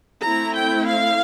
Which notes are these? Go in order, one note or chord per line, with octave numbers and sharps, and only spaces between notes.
A3 C4 E4 A#5
G5
F5